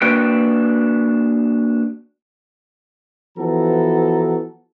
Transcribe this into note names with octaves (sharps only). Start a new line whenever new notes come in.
A#3 D4 F#4 B4 G5
E3 F3 B3 F#4 A4 A#5